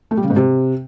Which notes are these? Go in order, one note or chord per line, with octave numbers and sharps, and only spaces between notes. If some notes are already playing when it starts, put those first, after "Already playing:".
A3
G3
C#3
G#2
C3